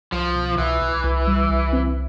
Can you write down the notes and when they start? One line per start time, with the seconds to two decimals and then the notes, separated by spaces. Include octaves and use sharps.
0.12 C2 F3
0.36 B2
0.58 C2 E3
0.82 C2
1.04 C2
1.27 G3
1.50 C2
1.73 C4